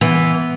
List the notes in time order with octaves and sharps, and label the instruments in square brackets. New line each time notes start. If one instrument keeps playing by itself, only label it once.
[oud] E3 [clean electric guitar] B3